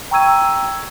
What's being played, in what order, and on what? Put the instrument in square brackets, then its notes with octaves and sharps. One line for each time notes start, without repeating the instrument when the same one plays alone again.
[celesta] G5 A#5 C#6 E6 G#6 D#7